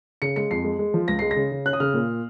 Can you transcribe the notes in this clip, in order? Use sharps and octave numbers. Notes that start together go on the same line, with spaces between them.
C#3 C#7
G#3 C#7
F2 C7
G#3
G#3
F3
C#2 A#6
G#3 C7
A#6
C#3
C#3
C#4 F#6
D#6
C#3 F6
A#2